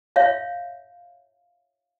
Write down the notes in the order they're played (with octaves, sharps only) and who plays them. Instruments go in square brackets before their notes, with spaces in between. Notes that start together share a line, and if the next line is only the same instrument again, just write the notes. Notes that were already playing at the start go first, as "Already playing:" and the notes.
[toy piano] C#5 E5 F5